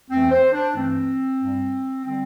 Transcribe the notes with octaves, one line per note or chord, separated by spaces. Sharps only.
E2 E3 A3 C4
C5
D4
G2 E3 A3 C4
G2 G3
D3 G3 C4